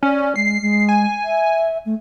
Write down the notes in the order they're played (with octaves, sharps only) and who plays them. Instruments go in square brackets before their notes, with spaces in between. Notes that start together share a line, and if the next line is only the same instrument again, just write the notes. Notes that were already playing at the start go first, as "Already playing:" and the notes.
[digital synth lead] C#4 [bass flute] D5
[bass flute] G#3 [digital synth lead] C7
[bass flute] G#3
[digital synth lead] G#5
[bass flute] E5
A3